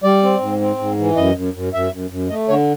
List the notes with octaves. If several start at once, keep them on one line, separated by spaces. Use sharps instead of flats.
G3 D5
C4
G#2
C4
G#2
E3
F#2 D#5
F#2
F#2
F#2 E5
F#2
F#2
A3 D#5
D3 C#5